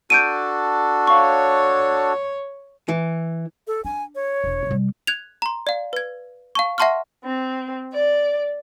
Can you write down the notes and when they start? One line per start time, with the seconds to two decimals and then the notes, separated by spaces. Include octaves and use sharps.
0.10 D4 F#4 A4 G6 D7 D#7
1.07 C#5 F5 C#6
2.89 E3
3.67 A4
3.85 D4 G#5
4.15 C#5
4.44 E1
4.67 C3 G3
5.07 F#6 G#6 F7
5.42 A#5 C6
5.67 D5 F5
5.93 B4 G#6
6.55 F5 A5 C#6
6.78 E5 F#5 A5 C6 C#6 F6
7.23 C4
7.92 D5